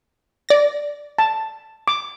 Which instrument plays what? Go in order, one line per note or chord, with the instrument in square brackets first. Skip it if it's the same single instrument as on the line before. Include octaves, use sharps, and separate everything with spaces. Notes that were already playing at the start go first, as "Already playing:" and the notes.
[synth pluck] D5 A#6
[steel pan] A5
D6